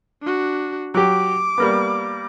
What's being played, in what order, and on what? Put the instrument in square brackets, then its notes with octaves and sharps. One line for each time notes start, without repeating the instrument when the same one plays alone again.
[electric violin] D4 F#4
[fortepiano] F#3 G4 [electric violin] D6
[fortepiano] G3 A#3 B3